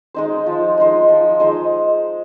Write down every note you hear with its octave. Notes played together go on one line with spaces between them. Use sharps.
G#3 D#4 C5
F3
G#3 D#4 C5
F3
G#3 D#4 C5